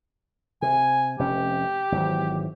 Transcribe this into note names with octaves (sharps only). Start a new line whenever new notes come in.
C3 G#5
F1 C3 C#4 G4
G#1 E3 F#3